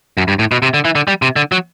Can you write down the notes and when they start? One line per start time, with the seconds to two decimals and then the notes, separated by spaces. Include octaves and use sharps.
0.18 F#2
0.28 G2
0.39 A2
0.52 B2
0.62 C3
0.74 D3
0.85 E3
0.95 D3
1.08 G3
1.22 C3
1.36 D3
1.52 F#3